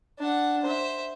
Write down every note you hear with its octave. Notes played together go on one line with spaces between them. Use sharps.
D4 F#5
C5 E5